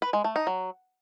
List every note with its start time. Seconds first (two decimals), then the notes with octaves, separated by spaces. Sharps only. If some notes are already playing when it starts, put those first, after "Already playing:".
0.02 B4
0.13 G#3
0.24 A3
0.36 D#4
0.47 F#3